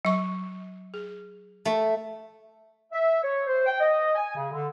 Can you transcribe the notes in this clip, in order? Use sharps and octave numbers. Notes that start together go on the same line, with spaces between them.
F#3 C#6
G#4
A3
E5
C#5
C5
G5
D#5
G#5
C#3
D3